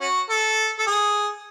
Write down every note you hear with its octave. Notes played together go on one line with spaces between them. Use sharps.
C#4 F#4
A4
A4
G#4